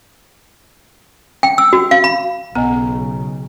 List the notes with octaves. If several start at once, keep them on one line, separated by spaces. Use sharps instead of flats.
G5
E6
F#4
F5
B5
B1 C#3 B3 D#5 G#5 A#5